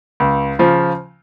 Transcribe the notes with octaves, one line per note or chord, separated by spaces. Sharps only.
C#2
C#3 F3